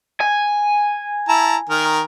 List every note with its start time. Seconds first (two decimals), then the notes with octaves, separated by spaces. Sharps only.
0.20 G#5
1.29 E4 A5 A#5
1.70 D#3 A#4